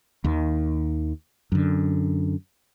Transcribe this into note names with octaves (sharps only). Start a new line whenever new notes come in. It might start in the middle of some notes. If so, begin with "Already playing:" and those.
D#2 D#3
F#2 D3